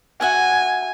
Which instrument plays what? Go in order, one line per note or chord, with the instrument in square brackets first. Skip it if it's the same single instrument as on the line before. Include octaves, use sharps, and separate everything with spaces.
[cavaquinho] F#4 E5 F#5 [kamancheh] G#5